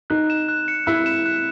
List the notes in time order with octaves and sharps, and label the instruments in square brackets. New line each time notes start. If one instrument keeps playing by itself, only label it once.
[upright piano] D#4 [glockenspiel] F#6
[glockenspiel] E7
F#6
C#7
[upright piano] E4 [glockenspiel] F#6
[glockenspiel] E7
F#6